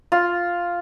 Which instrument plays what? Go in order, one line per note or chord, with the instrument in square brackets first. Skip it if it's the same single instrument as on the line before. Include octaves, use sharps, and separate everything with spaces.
[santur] F4